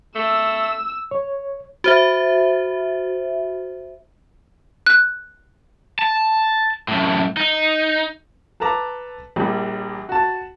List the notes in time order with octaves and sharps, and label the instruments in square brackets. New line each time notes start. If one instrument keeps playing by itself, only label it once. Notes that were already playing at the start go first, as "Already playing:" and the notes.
[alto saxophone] A3 [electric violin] E6
[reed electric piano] C#5
[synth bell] F#4 C5 E5
[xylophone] F#6
[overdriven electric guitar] A5
F#2 A2
D#4
[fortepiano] A4 B4 A5 A#5 D6
A#1 A#2 G3
F#4 A5